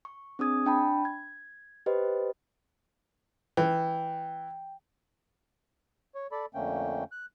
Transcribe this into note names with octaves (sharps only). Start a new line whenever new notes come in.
C#6
C4 D4 G#4 D#6 G#6
D4 G5 A5 B5
G#6
G4 B4 C5 D#5
E3 G5
C#5
A4 D5 B5
F2 D3 A3 A#3 C#4 G5
F#6